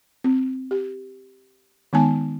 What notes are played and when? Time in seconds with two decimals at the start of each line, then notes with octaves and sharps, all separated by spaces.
0.24 C4
0.71 G4
1.93 D#3 G#3 B3 D#4 G#5 A5